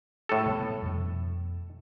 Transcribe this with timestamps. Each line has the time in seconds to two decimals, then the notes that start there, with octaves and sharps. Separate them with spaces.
0.29 A2 A4
0.46 C3 G3 B3
0.82 F2 B2